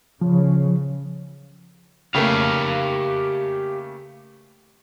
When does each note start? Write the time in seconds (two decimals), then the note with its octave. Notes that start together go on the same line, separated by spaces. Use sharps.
0.21 C#3 F3
2.15 C#3 A3 A#3 G4 F5